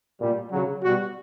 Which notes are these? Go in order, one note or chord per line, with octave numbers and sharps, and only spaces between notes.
A#2 G3
C#3 F#3
B2 G3 F#4